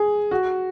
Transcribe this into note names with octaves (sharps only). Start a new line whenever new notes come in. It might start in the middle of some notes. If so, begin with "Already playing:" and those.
Already playing: G#4
F#4